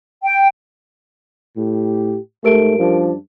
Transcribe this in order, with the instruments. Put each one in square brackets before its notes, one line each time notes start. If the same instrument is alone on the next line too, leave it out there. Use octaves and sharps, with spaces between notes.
[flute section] G5
[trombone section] A2 G4
[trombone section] G#2 [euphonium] A3 [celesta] G4 A#4 D7
[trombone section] F#2 G3 D4 [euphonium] F3